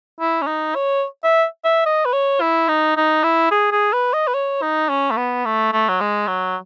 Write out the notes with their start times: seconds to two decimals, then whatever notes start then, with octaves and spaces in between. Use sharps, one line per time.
0.20 E4
0.42 C#4
0.47 D#4
0.75 C#5
1.24 E5
1.65 E5
1.86 D#5
2.05 B4
2.13 C#5
2.41 E4
2.68 D#4
2.97 D#4
3.24 E4
3.51 G#4
3.72 G#4
3.93 B4
4.13 D#5
4.27 B4
4.34 C#5
4.62 D#4
4.89 C#4
5.11 A3
5.17 B3
5.45 A3
5.73 A3
5.88 F#3
6.00 G#3
6.27 F#3